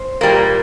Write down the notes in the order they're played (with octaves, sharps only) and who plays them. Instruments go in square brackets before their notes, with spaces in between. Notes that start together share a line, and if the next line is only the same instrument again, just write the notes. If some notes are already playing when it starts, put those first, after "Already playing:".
Already playing: [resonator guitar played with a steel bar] C5
A#2 G3 A#3